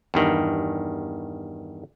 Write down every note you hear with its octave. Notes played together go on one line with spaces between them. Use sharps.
E2 G2 D#3